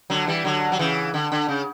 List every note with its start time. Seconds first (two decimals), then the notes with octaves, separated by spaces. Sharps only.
0.10 D3 F#3
0.27 E3 G3
0.44 D3 F#3
0.72 F#3
0.79 C#3 E3
1.14 D3
1.32 D3
1.48 C#3